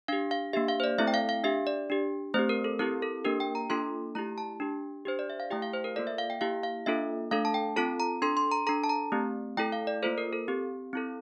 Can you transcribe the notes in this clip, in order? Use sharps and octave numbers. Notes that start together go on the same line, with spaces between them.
D4 G4 F5
F5
A#3 D4 G4 E5
F5
C5
D5
A3 C4 E4 A4 E5
G5
F5
F5
D4 G4 E5
D5
D4 G4
A3 C4 G4 C5
A#4
A4
C4 E4 G4 A#4
A4
A#3 D4 G4 A#4
G5
A#5
A#3 D4 F4 A4 C6
A3 E4 G4 A#5
A5
D4 G4
D4 G4 C5
D5
E5
F5
A3 E4 G4 G5
F5
C5
A#4
A#3 F4 A4 D5
E5
F5
G5
A#3 E4 G4 F5
F5
A#3 D4 F4 A4 E5
A3 D4 A4 F5
A5
G5
C4 F4 A4 A5
A#5
D4 A4 C6
C6
A#5
D4 A4 A#5
A5
A#5
A3 C4 G4
A3 E4 A4 G5
F5
D5
A#3 F4 A4 C5
A#4
A4
C4 G4
C4 E4 A4